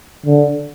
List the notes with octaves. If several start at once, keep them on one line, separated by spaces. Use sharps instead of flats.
D3